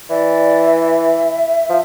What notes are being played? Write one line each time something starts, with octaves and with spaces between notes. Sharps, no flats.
E3 D5
E5
F3